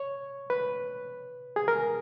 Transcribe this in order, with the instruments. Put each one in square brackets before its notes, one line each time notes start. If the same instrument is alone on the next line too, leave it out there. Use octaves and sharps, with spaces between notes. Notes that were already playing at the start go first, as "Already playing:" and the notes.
Already playing: [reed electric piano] C#5
B4
G#4
A#4